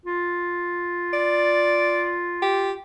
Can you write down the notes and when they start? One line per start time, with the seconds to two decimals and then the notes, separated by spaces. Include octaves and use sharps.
0.06 F4
1.13 D5
2.42 G4